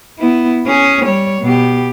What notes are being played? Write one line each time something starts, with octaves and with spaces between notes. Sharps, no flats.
B3 E4
C#4 G#4
G3 C#5
B2 G4